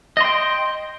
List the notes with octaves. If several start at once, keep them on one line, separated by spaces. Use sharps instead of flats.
D#5 G5 C6